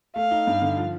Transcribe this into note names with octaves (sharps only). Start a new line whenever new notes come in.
A3 F5
D#4
G2
D3
F3